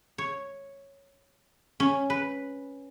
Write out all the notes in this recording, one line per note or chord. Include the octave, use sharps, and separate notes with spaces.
C#5
C#4
B4